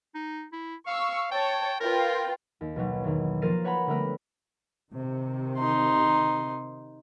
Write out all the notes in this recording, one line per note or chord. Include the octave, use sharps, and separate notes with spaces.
D#4
E4
F5 C#6 E6
C#5 G5 A5
F4 A#4 B4 G5
D#2
B1 B2 F#3
E2 D#3
F3 A#3 A#4 A6 C7 D#7
B4 C#5 F#5 A#5 B5
D3 G3 A3 B3 A#4 B4
C3 D#3
D#4 C6